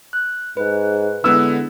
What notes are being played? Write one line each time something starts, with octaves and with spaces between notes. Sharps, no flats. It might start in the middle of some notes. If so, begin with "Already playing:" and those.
F#6
G#2 B4
D3 G#3 B3 E4 E6